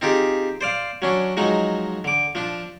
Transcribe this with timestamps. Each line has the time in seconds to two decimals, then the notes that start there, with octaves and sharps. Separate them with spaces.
0.01 C4 D#4 F4 G4 G#4
0.61 C5 D5 F5
1.02 F#3 C#4 D4
1.37 F3 F#3 G#3 D#4
2.04 D3 D6
2.35 F3 D4